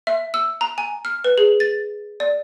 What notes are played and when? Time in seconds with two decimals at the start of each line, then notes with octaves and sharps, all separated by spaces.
0.07 E5
0.34 E6
0.61 A#5
0.78 G#5
1.05 F6
1.24 B4
1.38 G#4
1.60 A6
2.20 D5